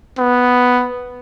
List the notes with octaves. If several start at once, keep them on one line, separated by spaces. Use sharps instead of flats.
B3